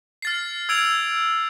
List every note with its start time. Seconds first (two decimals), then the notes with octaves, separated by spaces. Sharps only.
0.22 F6 A6 C7
0.69 E6 G#6 D7 F7